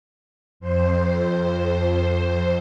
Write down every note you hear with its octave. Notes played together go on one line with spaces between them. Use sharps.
F2 C5